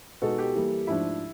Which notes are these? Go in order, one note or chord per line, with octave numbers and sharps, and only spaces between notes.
B2 G#3 B3 D#4 F#4 A4
G4
E3 G3 A#3
G#2 F3 A3 D4 E4